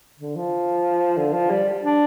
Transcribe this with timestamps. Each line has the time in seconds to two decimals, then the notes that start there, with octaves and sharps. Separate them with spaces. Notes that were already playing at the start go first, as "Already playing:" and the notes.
0.19 D3
0.36 F3
1.18 D3
1.33 F3
1.50 G3
1.83 D4